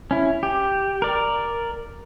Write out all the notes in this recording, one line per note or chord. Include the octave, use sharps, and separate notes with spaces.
C#4 E4
G4
A#4 D5